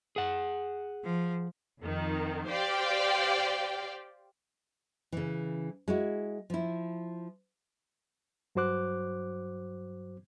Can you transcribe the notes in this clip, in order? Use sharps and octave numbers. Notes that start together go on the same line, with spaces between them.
G#4 F#5
F3
F2 D#3
G4 C5 D5 F5 G5
C#3 E3
G#3 E4 F#4
F3 E4
G2 F#3 F#4 C5 D6 F#6